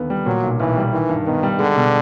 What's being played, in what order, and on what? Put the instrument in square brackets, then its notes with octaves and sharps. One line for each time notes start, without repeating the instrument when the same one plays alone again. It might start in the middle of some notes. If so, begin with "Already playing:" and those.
Already playing: [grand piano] D#2 D3 B3
G3
[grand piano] A#2 [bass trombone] F#3
[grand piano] B1
[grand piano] B1 [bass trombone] E3
[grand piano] G3
[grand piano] D#3 [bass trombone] E3
[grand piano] G2
[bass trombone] D#3 [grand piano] B3
[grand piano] G3
[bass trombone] D3 [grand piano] G#3
[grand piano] B2